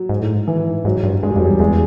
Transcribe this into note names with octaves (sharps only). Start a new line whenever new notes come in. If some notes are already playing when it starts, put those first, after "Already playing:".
Already playing: F#3
G#2
A2
G#2
E3
G#2 F#3
G2
G2 G#3
G3
F2 F#3
E2 G3
E2 G#3